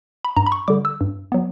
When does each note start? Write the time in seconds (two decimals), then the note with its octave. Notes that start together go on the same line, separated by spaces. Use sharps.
0.25 B5
0.36 G2 A#5
0.46 B5
0.52 C#6
0.68 D3 G3 D6
0.85 E6
1.01 G2
1.32 F#3 B3